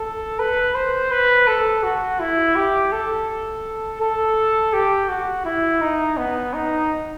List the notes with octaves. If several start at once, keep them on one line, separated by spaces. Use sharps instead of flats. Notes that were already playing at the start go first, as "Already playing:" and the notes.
Already playing: A4
B4
C5
B4
A4
F#4
E4
G4
A4
A4
G4
F#4
E4
D#4
B3
D#4